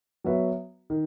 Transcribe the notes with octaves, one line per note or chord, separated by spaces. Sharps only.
F#3 B3 F#4 B4 E5
D#3